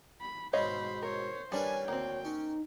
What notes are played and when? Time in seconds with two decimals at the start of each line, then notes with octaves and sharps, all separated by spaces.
0.21 B5
0.53 G#2 B2 C5 C#5 D#5 F5 B5
1.03 A#4 C5 C#5
1.52 G3 C#4 D4 A#4 B4 C#5 G#5
1.88 D2 A#3 C4 G5
2.25 C#4 D#4